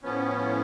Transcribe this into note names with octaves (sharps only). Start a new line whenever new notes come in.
A2 F3 B3 C#4